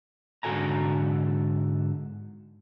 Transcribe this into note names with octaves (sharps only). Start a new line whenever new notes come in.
G#2 D3 F#4 A4 G#5 A#5